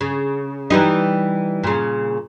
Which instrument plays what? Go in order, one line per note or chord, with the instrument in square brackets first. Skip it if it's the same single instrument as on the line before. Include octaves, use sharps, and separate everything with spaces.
[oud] C#3
E3 G3 D#4
A#2 C#3